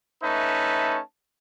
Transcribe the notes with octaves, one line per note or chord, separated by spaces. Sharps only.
A3 C#4 D#4 B4 E5 A5